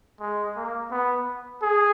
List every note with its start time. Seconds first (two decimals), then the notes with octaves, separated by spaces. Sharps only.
0.20 G#3
0.56 A#3
0.91 B3
1.62 G#4